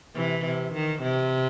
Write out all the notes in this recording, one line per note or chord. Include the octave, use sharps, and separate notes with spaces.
C3 E3
C3
D#3
C3